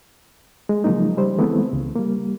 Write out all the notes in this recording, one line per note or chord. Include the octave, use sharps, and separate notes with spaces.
G#3
C#3 F3 F#3 G#3 A#3 D#4
C#3 G3 C5
E3 G#3 A3 B3 C4 E4
C#2 C#3
G3 A#3